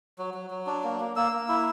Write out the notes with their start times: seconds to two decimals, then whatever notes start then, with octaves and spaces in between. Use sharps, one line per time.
0.18 F#3
0.34 F#3
0.50 F#3
0.67 D4
0.84 A#3
1.00 A#3
1.16 A#3 E6
1.32 A#3
1.49 E4